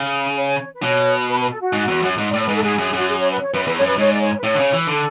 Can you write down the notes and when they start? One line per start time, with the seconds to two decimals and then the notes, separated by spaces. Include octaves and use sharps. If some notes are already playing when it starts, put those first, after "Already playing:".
Already playing: C#3
0.37 C#5
0.74 B4
0.82 B2 C#5
1.28 B4
1.40 B4
1.51 A4
1.62 F#4
1.73 G#2
1.88 E2
2.03 F#2
2.18 G#2
2.30 D5
2.34 A2
2.39 C#5
2.47 G#2 B4
2.55 A4
2.63 G#2 G#4
2.78 F#2
2.93 F#2 F#4
3.09 G#4
3.19 C#5
3.31 B4
3.43 C#5
3.54 F#2 B4
3.65 E2 B4
3.76 C#5
3.81 F#2
3.87 B4
3.98 G#2 C#5
4.12 D5
4.21 C#5
4.39 B4
4.43 A2 C#5
4.55 D3
4.59 C#3
4.73 E3
4.87 D3 A4